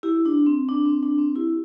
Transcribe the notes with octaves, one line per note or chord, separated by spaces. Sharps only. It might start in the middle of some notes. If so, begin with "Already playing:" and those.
E4 G4
D4
C4
D4
C4
D4
C4
E4 G4